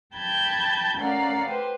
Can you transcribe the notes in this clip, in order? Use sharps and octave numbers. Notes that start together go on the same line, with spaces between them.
G5 A5 B5 G6 G#6
A3 C#4 A#4 D5 F5 F#5
G4 B4 C5